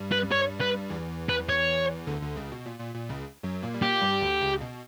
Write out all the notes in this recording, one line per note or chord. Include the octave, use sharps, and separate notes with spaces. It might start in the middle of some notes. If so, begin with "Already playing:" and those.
Already playing: G2 G3
B4
C#5
B4
E2 E3
B4
C#5
D2 D3
D2 D3
C#2 C#3
B2
A#2
A#2
A#2
C#2 C#3
F#2 F#3
A#2 A#3
G3
A#2 A#3 G4
G2 G3
D2 D3
C#2 C#3
B2